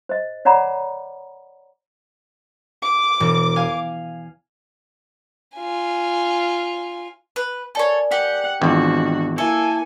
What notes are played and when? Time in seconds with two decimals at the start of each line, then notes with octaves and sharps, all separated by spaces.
0.09 C5 D#5
0.45 C#5 D5 F#5 A#5 B5 D6
2.82 D6
3.20 E1
3.56 F5 G#5
5.56 F4 G#5
7.36 B4
7.75 A4 A#4 C#5 D5 G#5
8.12 G4 F#5
8.62 G#1 E2 F3 D4 F#4
9.38 A#3 E4 A4 E5 G#5 C#7